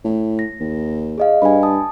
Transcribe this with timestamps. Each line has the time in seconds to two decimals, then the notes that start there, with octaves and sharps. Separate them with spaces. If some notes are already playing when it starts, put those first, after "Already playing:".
0.05 A2
0.39 A#6
0.60 D#2
1.18 G#4 D#5 F5
1.42 G2 G#5 B5
1.63 A5 D#6